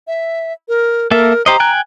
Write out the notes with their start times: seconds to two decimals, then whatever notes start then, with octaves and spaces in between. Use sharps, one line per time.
0.07 E5
0.69 A#4
1.11 A#3 A4 A#4 E5
1.46 G4 C5 D#5 A#5
1.60 G5 G#5 F#6